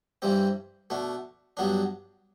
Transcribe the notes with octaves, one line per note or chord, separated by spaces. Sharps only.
G2 E3 G3 C4
B2 A3 D4
G2 F#3 B3 D4